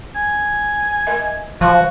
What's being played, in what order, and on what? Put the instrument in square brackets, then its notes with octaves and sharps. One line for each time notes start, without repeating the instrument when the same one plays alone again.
[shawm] G#5
[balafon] A#4 D#5 E5
[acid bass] F3 [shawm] F#4 [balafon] F5 C#6